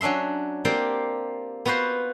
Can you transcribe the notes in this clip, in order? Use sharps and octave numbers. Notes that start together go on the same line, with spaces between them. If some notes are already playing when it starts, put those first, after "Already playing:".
F#3 C#4 D4 E5 C6
A#3 C4 F4 G4 D5
B3 F4 F#4 B4 C5